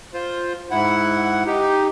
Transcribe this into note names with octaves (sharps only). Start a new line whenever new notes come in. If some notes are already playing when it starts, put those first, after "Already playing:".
F4 C5
G#2 E4 F#5
D#4 G4